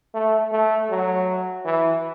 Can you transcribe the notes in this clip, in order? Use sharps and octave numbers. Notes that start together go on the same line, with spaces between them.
A3
A3
F#3
E3